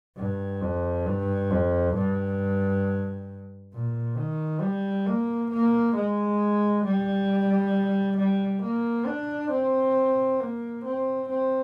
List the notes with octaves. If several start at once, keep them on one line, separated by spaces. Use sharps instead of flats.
G2
F2
G2
F2
G2
A#2
D#3
G3
A#3
A#3
G#3
G3
G3
A#3
D4
C4
A#3
C4
C4